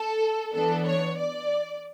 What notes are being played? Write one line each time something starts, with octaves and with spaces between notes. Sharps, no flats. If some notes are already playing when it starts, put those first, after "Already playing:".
Already playing: A4
E3 B3 D4 A4
C#5
D5